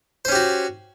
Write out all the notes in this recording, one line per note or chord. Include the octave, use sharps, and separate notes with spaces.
C#4 F#4 G4 C5